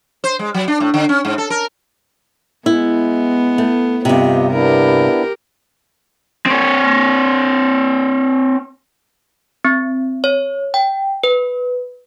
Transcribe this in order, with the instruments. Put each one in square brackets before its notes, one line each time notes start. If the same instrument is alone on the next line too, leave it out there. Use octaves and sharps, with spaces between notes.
[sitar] C5
G#3
F#3
D4
A2
D3
C#4
G#2
A4
A#4
[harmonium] G#3 [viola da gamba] B3 [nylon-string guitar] E4
[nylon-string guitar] A3
[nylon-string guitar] G2 C3 [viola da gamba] B3 [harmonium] F4 G4 D#5
[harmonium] B3 D4 E4 [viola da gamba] G4 A#4
[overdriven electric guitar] C4 C#5
[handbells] C4
C#5
G5
B4